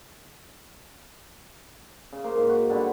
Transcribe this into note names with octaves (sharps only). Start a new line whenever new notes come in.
C#3
A#3 C5
G#2
F#4
D3 G3 B3 F#4